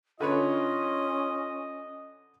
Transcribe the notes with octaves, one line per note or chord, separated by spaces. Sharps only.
D3 C#4 F4 B4 C#5 D#5